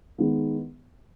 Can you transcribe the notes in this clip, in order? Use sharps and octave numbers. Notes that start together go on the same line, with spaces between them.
D#3 G#3 B3